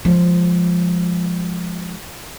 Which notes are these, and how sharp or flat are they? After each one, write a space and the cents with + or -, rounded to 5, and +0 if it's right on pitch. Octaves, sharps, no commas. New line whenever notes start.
F3 +0 G#3 +0